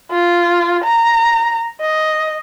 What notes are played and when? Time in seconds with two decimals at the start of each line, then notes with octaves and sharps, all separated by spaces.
0.11 F4
0.84 A#5
1.81 D#5